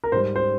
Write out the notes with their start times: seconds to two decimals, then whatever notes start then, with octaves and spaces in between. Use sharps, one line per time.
0.04 A#4
0.12 G#2 C5
0.16 G3
0.36 C5